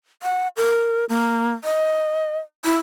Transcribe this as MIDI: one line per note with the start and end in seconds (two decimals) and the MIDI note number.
0.23 0.48 78
0.57 1.05 70
1.09 1.53 58
1.64 2.38 75
2.65 2.77 64